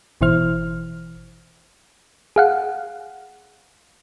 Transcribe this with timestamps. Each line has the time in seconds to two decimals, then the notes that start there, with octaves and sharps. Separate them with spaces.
0.21 G#1 B2 E3 E4 C5 F6
2.36 G#4 F5 F#5